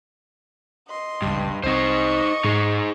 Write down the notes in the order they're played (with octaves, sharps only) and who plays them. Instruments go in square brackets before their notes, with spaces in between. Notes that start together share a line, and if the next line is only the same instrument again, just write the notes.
[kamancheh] D#5 C6
[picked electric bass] G1 C#2 [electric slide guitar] G2
[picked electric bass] C2 C4 [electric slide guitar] D#4 C5 [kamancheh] D#5 C#6
[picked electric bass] G#2 [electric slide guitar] D#4 G#4